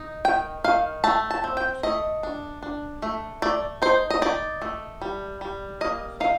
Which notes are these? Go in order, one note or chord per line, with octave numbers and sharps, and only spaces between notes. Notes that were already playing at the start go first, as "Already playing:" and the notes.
Already playing: D#4
D#3 G5
D#3 F5
A3 A5
A5
C4
G5
A3 D#5
D4
D4
A3
A3 D5
D#4 C5
D#5
D#4 D5
A3
G3
G3
A#3 D#5
D#4 F5